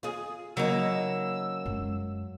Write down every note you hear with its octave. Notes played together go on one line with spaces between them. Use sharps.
F4 G#4
C#3 F#3 A#3 D#4 E6
F#2 G#3